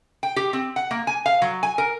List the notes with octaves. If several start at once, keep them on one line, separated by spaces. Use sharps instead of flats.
G5
G4
C4
F#5
A#3
G#5
F5
F#3
G#5
A#4